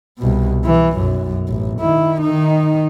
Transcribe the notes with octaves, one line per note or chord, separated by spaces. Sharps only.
C2 B2
E3
B1 F#2
A1
D#3 E4
D#3 D#4